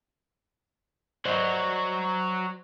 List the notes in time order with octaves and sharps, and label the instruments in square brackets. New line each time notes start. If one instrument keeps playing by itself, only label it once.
[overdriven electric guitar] F#3 F#4 [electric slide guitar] C5 D5 D#5